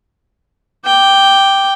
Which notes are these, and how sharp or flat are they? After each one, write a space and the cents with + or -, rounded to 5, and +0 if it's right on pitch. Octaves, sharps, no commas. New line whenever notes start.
G5 +0 D6 +0